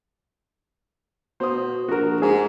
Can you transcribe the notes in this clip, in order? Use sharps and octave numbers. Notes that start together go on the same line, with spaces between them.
B2 C5 D#6
A#1 F#4 A#4
G#2 G#4